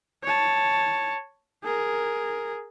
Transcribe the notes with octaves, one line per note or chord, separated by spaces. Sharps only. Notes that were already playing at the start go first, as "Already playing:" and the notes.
C#5 A5
G#4 A#4